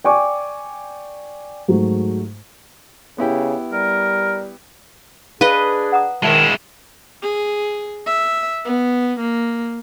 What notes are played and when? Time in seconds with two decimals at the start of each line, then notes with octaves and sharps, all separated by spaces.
0.04 D5 G5 G#5 C#6 D6
1.68 G#2 F#3 A3
3.18 C#3 B3 E4 G4
3.73 G3 A#4
5.41 D4 G#4 B4 D#5 F5
5.92 F#5 A#5 D#6
6.23 D#3 G#3 E4 E5 A5
7.22 G#4
8.06 E5
8.65 B3
9.20 A#3